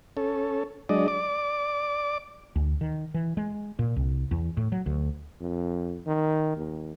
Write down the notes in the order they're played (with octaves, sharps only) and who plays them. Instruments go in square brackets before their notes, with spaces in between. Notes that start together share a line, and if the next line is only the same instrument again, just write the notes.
[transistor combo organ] C#4 A4
F#3 G#3 D4 D5 D#5
D5 D6
[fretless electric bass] D2
D#3
E3
G#3
A#2
C2
E2
A2
F#3
D2
[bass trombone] F2
D#3
D#2